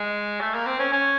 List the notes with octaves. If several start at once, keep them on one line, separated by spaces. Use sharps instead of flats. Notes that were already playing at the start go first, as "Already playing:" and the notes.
Already playing: G#3
A3
A#3
C4
C#4
C#4